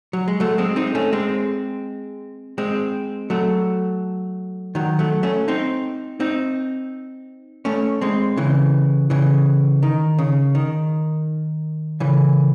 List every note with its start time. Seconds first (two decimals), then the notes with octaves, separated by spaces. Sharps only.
0.13 F#3
0.28 G#3
0.40 F#3 A3
0.58 G#3 C4
0.76 C4 D#4
0.95 A3 C#4
1.13 G#3 C4
2.58 G#3 C4
3.30 F#3 A3
4.75 D#3 F#3
4.99 F#3 A3
5.23 A3 C#4
5.48 C4 D#4
6.20 C4 D#4
7.65 A3 C#4
8.02 G#3 C4
8.37 C#3 E3
9.10 C#3 E3
9.83 D#3
10.19 C#3
10.55 D#3
12.00 C#3 E3